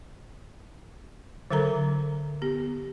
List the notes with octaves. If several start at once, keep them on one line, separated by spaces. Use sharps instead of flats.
D3 F#3 A4 A#4 A#5
B3 G4